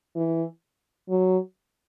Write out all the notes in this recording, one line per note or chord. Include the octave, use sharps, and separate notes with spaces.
E3
F#3